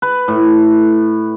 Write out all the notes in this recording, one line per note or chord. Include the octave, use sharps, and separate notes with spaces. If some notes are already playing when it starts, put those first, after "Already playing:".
B4
A2